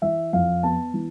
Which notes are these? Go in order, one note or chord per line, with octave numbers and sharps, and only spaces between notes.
E3 E5
F2 F5
B3 A5
E3